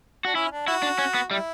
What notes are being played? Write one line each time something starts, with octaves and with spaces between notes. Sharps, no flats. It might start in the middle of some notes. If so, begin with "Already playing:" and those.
D4 F#4
C#4 E4
D4
E4 F#4
D4
C#4
B3
G3 E4